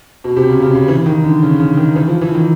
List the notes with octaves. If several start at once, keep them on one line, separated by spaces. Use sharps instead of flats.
B2
C3
C#3
C#3
C#3
E3
D#3
D3
C#3
C#3
D#3
E3
F3
E3
D#3